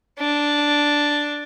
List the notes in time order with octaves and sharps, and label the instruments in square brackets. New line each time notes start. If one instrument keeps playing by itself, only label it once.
[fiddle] D4